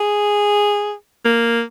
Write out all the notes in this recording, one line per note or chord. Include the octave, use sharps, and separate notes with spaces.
G#4
A#3